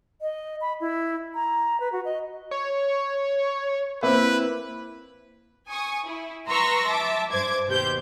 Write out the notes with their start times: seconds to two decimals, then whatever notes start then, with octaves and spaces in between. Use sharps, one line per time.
0.21 D#5
0.61 B5
0.81 E4
1.35 A#5
1.80 B4
1.92 F#4
2.05 D#5
2.51 C#5
4.03 A#3 C4 E4 B4
5.69 G#5 C#6 D#6
6.06 E4
6.48 B4 A#5 C6 C#6 E6 A#6
6.87 E5 A5 D6
7.32 G2 C5 D6 G#6
7.67 D#2 B2 G4 C5 G6